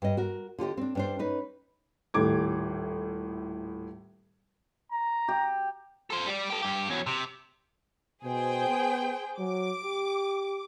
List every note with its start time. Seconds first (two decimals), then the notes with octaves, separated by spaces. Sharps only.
0.02 G2 D#5
0.17 F#4 A#4
0.59 D3 F4 G4 D#5
0.77 C4 D4
0.95 G2 D4 C5
1.19 C#4 D#4 B4
2.14 D#1 A2 D6 G#6
4.92 A#5
5.28 G4
6.10 A4 C5
6.26 G3 D5
6.50 G4 A4
6.62 G2 G4
6.90 E2 F#3
7.06 C3
8.24 B2 G#4 C5 G5
8.68 B3
9.39 F#3 D6
9.84 G4